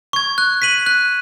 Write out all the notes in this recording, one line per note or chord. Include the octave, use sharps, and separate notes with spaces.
C#6 G#6
F#6
B6 D#7 F#7
F#6